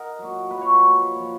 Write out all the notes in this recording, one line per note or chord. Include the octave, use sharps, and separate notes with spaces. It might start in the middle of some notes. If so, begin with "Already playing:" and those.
Already playing: A#4 D#5 F#5
A#2 F#3
A#2 F#3 B4
C#5
B4
A#2 F3
A#2 F3